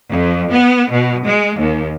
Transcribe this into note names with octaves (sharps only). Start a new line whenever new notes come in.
F2
B3
B2
G#3
D#2